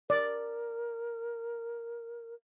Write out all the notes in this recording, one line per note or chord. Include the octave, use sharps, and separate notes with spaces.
A#4 D5